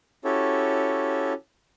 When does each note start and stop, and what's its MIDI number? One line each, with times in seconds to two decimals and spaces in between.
0.25 1.33 61
0.25 1.33 64
0.25 1.33 66
0.25 1.33 67
0.25 1.33 69
0.25 1.33 73